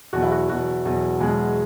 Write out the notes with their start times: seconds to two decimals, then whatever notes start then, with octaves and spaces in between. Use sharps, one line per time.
0.13 E2 B2 F#3 F#4
0.23 E4
0.32 F#4
0.49 E2 B2 F#3 F#4
0.85 E2 B2 F#3
1.20 E2 B2 F#3 G#3 G#4